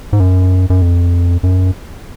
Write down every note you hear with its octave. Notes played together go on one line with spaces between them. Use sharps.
G#2
F#2
F#2
F2
F#2